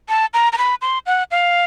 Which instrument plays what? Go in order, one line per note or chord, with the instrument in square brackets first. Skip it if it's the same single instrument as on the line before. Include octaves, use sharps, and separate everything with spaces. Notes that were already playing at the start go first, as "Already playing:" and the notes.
[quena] A5
A#5
A#5
B5
C6
F#5
F5